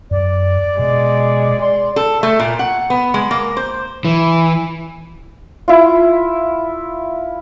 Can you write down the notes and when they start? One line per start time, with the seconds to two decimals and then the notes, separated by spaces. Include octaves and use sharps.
0.11 F#2 D5
0.79 B2 G#3
1.61 D5 C6
1.96 A4
2.23 A3
2.40 A#2
2.59 F#5
2.90 B3
3.14 G#3
3.31 A#3
3.57 C5
4.05 E3
5.68 E4 F4